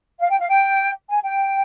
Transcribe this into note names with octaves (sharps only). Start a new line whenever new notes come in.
F5
G5
F5
G5
G#5
G5